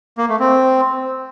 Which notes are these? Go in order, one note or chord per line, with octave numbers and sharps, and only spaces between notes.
A#3
A3
C4